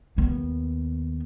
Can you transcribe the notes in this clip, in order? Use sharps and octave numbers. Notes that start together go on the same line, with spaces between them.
D#2 B3